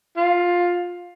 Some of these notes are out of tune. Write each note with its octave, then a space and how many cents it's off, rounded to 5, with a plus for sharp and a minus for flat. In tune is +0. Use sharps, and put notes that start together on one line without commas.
F4 +10